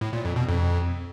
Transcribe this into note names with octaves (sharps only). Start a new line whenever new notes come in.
A2
A#2
F2
B2
F2